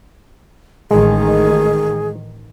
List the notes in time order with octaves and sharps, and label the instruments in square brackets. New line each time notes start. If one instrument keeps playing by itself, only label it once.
[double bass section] A1 D#3 [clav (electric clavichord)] G#3 [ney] G#4